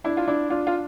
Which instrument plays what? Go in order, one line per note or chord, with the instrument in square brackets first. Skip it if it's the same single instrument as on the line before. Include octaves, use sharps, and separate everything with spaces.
[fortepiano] D4 [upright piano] E4
[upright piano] F4
[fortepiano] D4 [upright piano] E4
[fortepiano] D4 [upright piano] F4
[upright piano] F4